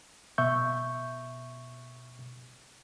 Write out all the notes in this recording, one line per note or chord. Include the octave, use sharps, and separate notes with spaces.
B2 E5 C#6 G6